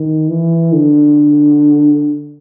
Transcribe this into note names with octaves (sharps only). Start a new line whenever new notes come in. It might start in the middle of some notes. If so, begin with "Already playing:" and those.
Already playing: D#3
E3
D3